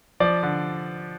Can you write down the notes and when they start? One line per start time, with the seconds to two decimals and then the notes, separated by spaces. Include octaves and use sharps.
0.20 F3 D5
0.43 D3